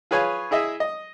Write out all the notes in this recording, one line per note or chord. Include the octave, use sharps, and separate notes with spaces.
F4 G#4 B4 C#5 G#5
E4 G#4 D#5 E5
D#5